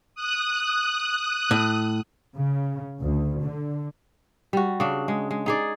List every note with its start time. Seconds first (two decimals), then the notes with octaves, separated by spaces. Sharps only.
0.15 D#6 F#6
1.51 A2
2.34 C#3
3.00 D2
3.42 D3
4.53 G3 F#4
4.80 C#3 D4
5.08 G#3
5.31 G#3
5.46 D#4 G#4 D5